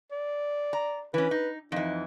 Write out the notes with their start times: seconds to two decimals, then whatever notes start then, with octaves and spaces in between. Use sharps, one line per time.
0.11 D5
0.73 A#5
1.14 E3 C#4 B4
1.31 D#4
1.72 F2 E3 D#4